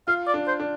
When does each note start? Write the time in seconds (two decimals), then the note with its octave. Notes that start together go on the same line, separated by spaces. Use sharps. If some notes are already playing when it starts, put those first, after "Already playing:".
0.08 F4 F5
0.27 D5
0.34 D4
0.47 C5
0.60 D4